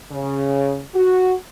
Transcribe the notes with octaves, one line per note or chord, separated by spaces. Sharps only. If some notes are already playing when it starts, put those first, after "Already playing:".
C#3
F#4